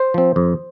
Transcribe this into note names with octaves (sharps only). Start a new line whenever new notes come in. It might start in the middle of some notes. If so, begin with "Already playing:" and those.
Already playing: C5
F3 C4
F2